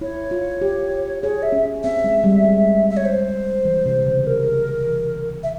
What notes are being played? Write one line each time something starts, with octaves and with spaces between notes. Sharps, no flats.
E4 C#5
F4
G4
G#4 C#5
E5
C#4
C4 E5
G#3
G3
G#3
E5
C#5
C5
E3
C3
C#3
A#4
E3
E5